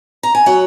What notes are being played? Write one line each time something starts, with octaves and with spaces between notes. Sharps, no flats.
A#5
G#5
F#3 C#5 F#5